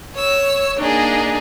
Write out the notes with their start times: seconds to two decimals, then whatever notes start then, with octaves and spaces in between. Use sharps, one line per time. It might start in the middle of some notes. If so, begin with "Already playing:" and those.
0.15 C#5 E6
0.79 A#3 D4 D#4 G#4